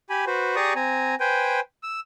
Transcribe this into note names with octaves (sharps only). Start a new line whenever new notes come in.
G4 G#5 B5
F#4 B4 C5
G4 G#4 D5 A#5 C#6 D#6
C4 G#5 A#5
B4 C5 G5 G#5
E6